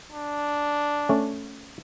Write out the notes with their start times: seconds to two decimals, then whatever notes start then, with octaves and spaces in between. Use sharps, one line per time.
0.12 D4
1.09 A3 C#4 A5